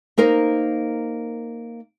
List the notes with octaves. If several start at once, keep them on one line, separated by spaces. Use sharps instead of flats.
A#3 D#4 A#4 C5